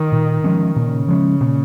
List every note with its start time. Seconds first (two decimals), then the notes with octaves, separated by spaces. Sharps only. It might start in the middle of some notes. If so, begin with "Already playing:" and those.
Already playing: D#3
0.12 A#2
0.44 F3 G#3 C#4
0.76 A#2 C#3
1.08 F3 G#3 C#4
1.40 A#2